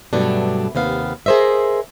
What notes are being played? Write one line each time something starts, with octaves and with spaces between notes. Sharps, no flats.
G2 B2 F#3 A3 D4
D#2 C3 B3 F5
G#4 A#4 C5 D#5 E5